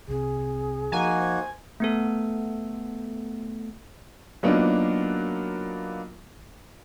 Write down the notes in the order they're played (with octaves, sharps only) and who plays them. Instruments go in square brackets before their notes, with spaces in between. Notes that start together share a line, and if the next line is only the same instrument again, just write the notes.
[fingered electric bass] C2 C3 C4 [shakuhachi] G#4
[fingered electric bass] F3 [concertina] A#3 D#4 F#4 [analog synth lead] G#5
[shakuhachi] C5
[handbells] A3 B3 A4
[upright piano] F#3 A#3 B3 D4 D#4 F4